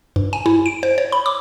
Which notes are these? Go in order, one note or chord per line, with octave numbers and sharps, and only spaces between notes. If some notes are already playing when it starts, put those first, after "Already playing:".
G2
G#5
E4
D7
C5
C#5
B5
D6